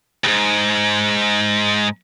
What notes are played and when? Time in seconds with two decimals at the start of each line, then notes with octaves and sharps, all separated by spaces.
0.24 D2 G#2